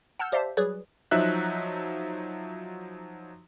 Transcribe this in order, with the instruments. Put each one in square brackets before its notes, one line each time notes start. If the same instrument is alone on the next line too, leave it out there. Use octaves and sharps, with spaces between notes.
[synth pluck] F#5 A5 E6 F6 G6
G4 C5 D5 E5 F5 A5
F#3 G3 G#4 B4 C#5 D5
[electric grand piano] F3 F#3 D#4 E5 F#6